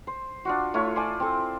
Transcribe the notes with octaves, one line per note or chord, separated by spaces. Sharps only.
C5
D4 F4 F#4
A3 E4 F4 C#5
C5 D5 G#5 A5
C4 A4